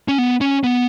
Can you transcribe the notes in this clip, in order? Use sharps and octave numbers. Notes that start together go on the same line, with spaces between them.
C#4
B3
C#4
B3